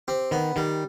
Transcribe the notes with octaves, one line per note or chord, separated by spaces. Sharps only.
C4 G4
D#3 B3
D#3 G3